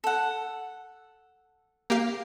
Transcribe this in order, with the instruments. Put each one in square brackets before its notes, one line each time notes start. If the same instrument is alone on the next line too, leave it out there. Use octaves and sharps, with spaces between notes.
[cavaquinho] A4 F#5
[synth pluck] A#3 G4 F5